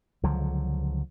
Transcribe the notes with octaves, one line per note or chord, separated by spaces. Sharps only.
C#2 D3 F3 F#3